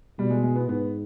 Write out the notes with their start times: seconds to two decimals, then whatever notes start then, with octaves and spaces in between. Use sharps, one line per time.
0.19 B2 G3
0.30 G#3
0.43 G#3
0.55 B3
0.69 G#2 B3